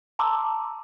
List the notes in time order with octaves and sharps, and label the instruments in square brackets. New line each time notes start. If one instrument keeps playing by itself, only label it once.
[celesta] A5 A#5 C6 D6 E6